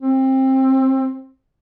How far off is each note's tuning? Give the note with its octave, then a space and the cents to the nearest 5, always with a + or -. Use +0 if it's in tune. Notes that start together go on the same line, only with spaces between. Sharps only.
C4 +20